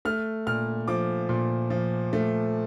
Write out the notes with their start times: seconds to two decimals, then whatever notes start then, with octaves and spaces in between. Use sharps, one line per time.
0.05 A3 F6
0.47 A#2 F6
0.88 F3 D6
1.29 A#2
1.70 F3
2.13 A3